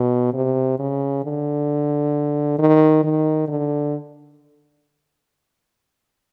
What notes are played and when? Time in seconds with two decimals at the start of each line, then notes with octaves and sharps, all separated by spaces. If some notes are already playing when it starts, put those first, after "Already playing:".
Already playing: B2
0.34 C3
0.79 C#3
1.25 D3
2.59 D#3
3.04 D#3
3.48 D3